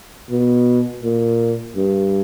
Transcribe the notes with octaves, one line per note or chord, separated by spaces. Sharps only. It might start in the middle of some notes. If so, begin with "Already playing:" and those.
B2
A#2
G2